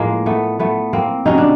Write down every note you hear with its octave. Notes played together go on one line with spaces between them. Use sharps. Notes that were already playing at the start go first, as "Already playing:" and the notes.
Already playing: A2 F3 G#3 A#3
A3 B3
A3 B3
A#3 C4
C3 D#3 F#3 C#4 D#4
D4